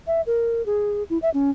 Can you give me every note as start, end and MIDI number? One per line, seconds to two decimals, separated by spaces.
0.07 0.21 76
0.26 0.64 70
0.66 1.03 68
1.10 1.18 64
1.22 1.30 76
1.34 1.50 61